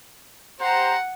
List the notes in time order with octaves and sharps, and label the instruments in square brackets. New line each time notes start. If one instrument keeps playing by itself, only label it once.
[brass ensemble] G4 C5 A#5 [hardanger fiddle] F#5